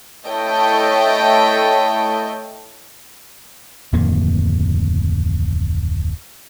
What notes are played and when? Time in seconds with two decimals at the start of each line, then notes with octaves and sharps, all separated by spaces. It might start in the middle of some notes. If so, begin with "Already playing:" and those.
0.28 A3 E4 A4 C#5 D#5 G5
3.93 D1 F2 D#3 A#3